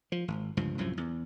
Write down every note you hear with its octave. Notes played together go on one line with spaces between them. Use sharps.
F3
G#1
G1 C#2 G2 F3
C2 F#2 A2 F3
E2